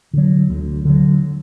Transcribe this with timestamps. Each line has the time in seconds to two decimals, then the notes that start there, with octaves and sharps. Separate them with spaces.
0.13 D3 F#3
0.49 D2
0.85 D3 F#3